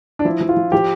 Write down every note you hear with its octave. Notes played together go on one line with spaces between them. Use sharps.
D4
F3 E4
F3
F4
F3
F3 G4